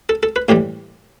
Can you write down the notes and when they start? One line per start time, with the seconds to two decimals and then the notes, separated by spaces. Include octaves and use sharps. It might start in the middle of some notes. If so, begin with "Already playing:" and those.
0.09 A4
0.23 A4
0.36 B4
0.49 A2 E3 G3 G4